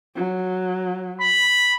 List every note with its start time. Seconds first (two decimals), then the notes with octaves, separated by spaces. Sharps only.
0.16 F#3
1.21 B5